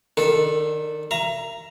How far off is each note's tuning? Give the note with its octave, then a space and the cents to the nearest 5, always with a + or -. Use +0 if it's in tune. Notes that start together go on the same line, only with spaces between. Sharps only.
D#3 -25 D4 +0 A4 +0
E5 +40 A#5 +0